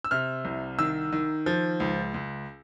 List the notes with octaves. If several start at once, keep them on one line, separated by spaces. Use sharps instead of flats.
E6
C3 F6
C2
D#3 E6
D#3
F3
C#2
C#2